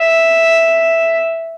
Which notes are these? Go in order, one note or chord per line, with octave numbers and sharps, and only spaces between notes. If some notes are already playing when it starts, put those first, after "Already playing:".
Already playing: E5